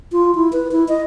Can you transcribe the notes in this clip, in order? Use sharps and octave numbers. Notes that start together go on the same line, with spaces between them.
F4
E4
B4
E4
D#5